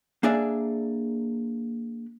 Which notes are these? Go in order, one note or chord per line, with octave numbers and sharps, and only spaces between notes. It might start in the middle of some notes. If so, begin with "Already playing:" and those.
A#3 D4 G#4 D5 E5